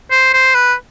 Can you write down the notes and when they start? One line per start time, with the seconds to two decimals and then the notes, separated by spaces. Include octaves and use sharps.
0.11 C5
0.33 C5
0.55 B4